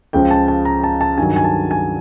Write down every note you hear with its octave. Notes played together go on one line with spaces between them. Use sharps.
C#2 C#3 F3 G5
A5
A5
A#5
A5
A5
G2 D#3 F#3 G#5
G#5
A5
G#5